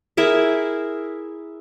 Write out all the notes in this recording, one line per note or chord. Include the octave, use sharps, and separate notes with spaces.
E4 G#4 A#4 E5